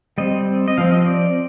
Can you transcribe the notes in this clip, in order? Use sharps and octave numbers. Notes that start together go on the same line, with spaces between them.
G3 C4 D#5
D#5
F3 C4 F5
D#5
D5